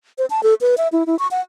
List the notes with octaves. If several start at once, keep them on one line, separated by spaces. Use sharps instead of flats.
C5
A5
A4
B4
E5
E4
E4
C#6
F#5